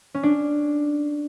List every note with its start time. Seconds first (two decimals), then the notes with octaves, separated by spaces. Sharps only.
0.15 C#4
0.23 D4